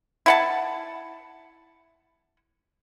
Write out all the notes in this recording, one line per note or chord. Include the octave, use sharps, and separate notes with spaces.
E4 F#5 A5